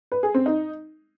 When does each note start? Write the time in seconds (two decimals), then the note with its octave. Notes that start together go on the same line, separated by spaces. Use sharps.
0.12 B4
0.23 G#4
0.34 C4
0.46 D#4